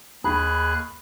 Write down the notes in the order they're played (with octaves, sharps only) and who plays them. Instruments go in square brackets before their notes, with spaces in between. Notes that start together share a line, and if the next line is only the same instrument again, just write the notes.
[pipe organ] D#2 G#4 F#6 [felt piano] B5